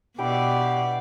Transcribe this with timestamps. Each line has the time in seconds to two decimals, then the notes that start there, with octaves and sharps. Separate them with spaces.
0.19 B2 D4 E4 G4 D5 F#5